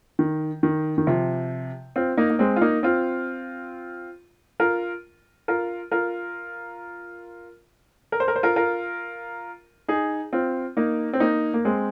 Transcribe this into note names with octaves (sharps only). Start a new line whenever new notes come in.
D#3
D#3
D#3
C3 F3
C4 F4
A#3 D#4
A#3
G#3 C4
F4
A#3 D#4
C4 F4
F4 A#4
F4 A#4
F4 A#4
A#4
C5
A#4
C5
F4 A#4
F4 A#4
D#4 G#4
C4 F4
A#3 D#4
C4
A#3 D#4
A#3
G#3 C4